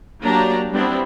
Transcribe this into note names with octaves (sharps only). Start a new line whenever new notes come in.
F#3 A#3 D4 G4 A#5
G3 B3 C4 D4 E4